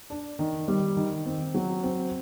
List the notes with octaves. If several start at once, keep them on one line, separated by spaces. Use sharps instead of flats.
D4
D#3
G3
D#3
C4
F#3
C4